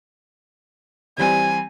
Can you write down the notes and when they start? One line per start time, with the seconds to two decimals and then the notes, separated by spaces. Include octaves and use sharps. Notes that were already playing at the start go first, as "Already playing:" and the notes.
1.18 E3 G3 C4 G#5